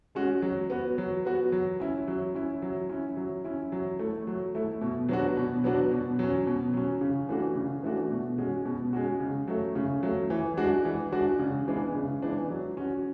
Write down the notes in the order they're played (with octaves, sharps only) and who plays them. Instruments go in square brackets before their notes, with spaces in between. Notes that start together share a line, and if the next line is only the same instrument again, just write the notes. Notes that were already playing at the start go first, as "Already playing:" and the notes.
[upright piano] G#3 C#4 F#4
F#3
B3 F#4
F#3
B3 F#4
F#3
C#4 E4
F#3
C#4 E4
F#3
C#4 E4
F#3
C#4 E4
F#3
A3 E4
F#3
A3 E4
B2
F#3 B3 D4 F#4
B2
F#3 B3 D4 F#4
B2
F#3 C#4
B2
F#3 C#4
C#3
E3 A3 D4 F#4
C#3
E3 A3 D4 F#4
B2
G#3 C#4 F#4
B2
G#3 C#4 F#4
C#3
F#3 A3
C#3
F#3 A3
E3
G#3 D4 F#4
E3
G#3 D4 F#4
C#3
E3 G#3 B3 D4
C#3
E3 G#3 B3 D4
F#3
C#4 F#4